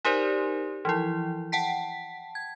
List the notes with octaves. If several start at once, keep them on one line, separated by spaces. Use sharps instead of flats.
D#4 G4 A#4 C5 D5
E3 F3 E4
F#5 G5 A5 B6
G#6